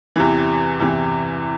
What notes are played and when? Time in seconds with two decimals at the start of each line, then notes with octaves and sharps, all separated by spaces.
0.16 E2 C3 E3
0.80 E2 C3 E3